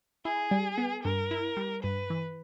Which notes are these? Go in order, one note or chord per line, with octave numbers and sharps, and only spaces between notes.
E4 G#4
G3
B3
G2 A#4
E4
G3
G2 B4
E3